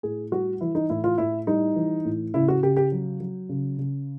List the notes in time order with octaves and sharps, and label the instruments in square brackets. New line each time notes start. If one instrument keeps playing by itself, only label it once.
[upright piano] A2 G#4
G3 F#4
E3 E4
D#4
A2 E4
F4
A2 E4
G3 D#4
E3
A2
C#3 E4
F#4
C#3 G4
G4
F#3
F#3
C#3
C#3